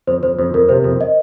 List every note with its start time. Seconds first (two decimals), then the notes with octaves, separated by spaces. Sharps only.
0.07 F2 C5
0.23 F2 C5
0.39 F2 C5
0.54 F2 A#4
0.69 C3 C5
0.84 F2
1.01 D#5